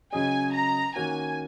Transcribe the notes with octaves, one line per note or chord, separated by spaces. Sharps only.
C#3 F#3 C#4 G#4 D#5 G#5
A#5
D#3 A#3 C#4 F#4 G#5